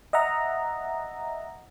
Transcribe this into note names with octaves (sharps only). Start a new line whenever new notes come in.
D#5 E5 F#5 A#5